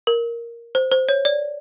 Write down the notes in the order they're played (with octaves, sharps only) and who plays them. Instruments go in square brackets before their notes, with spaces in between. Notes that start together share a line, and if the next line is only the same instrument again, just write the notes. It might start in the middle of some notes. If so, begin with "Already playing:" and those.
[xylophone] A#4
C5
C5
C#5
D5